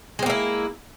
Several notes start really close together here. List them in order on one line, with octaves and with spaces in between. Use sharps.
G#3 C4 A#3 E4